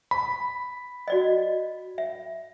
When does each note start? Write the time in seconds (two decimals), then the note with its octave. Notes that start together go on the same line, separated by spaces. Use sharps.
0.11 B5
1.08 F#4 D5 D#5
1.98 E5